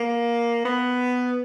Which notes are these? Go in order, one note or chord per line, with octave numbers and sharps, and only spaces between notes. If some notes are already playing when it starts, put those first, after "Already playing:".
Already playing: A#3
B3